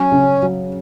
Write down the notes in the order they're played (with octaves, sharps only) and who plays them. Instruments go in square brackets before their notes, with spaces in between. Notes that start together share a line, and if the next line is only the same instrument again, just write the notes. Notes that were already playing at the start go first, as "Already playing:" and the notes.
Already playing: [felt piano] F#3 [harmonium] C#4
[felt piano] C#3
F#3